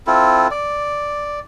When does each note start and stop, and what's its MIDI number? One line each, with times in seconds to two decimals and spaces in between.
0.07 0.48 60
0.07 0.48 64
0.07 0.48 65
0.07 0.48 69
0.51 1.39 74